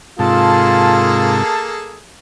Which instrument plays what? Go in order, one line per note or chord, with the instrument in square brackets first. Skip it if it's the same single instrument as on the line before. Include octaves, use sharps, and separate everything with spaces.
[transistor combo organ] G#2 C3 [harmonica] A#3 G#4 A4 [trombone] F4 [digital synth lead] A5